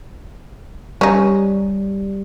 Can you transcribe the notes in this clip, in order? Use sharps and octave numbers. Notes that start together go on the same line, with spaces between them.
G3 C#4 D#4